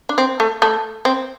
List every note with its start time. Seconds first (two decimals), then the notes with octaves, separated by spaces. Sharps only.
0.09 D4
0.18 C4
0.40 A3
0.62 A3
1.05 C4